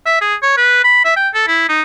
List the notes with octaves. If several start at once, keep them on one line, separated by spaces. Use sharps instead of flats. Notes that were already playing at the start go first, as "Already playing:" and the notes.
E5
G#4
C#5
B4
B5
E5
G5
A4
E4
D#4